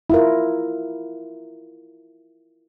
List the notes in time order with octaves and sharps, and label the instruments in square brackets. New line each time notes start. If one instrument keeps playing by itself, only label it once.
[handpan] E4 F4 A#4